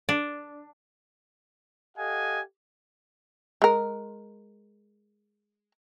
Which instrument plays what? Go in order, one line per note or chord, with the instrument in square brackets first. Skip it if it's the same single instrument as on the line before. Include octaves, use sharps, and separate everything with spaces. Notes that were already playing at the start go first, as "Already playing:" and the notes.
[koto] D4
[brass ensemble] G4 A4 D#5 F5 F#5 G#5
[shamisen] G#3 A#4